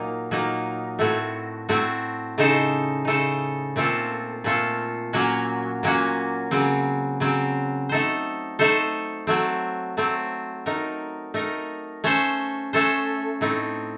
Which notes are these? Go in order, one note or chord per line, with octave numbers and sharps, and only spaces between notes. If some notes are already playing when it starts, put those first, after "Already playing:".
Already playing: A#2 F#3 A#3 D#4
A#2 F#3 A#3 D#4
A2 A3 C4 F#4
A2 A3 C4 F#4
C#3 A3 D#4 A4 C5
C#3 A3 D#4 A4 C5
A#2 A3 C4 F4 A4
A#2 A3 C4 F4 A4
A#2 F#3 A#3 C#4 F#4
A#2 F#3 A#3 C#4 F#4
C#3 F#3 C4
C#3 F#3 C4
A3 D#4 A4 C5
A3 D#4 A4 C5
F#3 A3 C4
F#3 A3 C4
A3 D#4 A#4
A3 D#4 A#4
A3 C#4 A4 C5
A3 C#4 A4 C5
A2 A3 C4 D#4